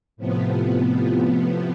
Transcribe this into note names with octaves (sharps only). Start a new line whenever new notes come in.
A2 C3 F3 B3